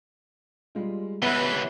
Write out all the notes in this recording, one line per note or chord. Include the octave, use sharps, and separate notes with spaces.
G3 G#3 F4
C#2 E3 B3 G4 B4 E5